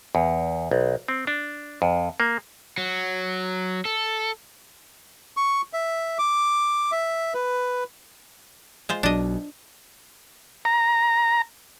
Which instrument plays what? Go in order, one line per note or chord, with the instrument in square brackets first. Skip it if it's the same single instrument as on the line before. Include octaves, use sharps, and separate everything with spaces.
[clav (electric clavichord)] E2
B1
C4
D4
F2
A#3
[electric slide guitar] F#3
A4
[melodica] C#6
E5
D6
E5
B4
[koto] G#3 F4 C5
[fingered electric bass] B1 F#3 [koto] D4 D#5
[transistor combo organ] A#5